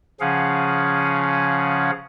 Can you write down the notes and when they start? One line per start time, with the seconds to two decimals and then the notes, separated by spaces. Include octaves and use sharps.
0.21 C#3 F3 C#4 G#4 F5 F#5